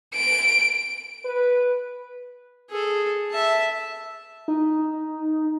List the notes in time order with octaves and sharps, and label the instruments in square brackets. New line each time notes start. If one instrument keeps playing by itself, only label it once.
[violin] D7
[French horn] B4
[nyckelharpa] G#4 A4
E5 A5
[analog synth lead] D#4